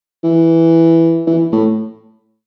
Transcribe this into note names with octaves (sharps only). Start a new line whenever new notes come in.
E3
E3
A2